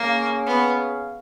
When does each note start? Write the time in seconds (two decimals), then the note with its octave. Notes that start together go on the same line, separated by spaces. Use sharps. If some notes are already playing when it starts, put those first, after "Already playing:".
Already playing: A#3 C#4 G#4 C#5 F5
0.47 B3